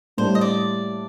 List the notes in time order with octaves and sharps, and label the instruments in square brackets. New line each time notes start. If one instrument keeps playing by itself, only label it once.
[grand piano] A2 G3 A#3 D4 [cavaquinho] C5
[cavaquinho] D#5
D5